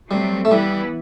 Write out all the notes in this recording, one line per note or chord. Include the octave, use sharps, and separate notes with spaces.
F#3 G3 A3 C4
A3
E3 G3 B3 E4 B4